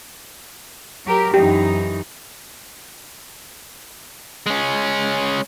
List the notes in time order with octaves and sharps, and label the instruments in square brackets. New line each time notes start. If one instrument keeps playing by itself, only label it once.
[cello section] F#3 G4 A#4
[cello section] F#2 E3 D#4 [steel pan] G4
[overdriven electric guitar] G#3 C#4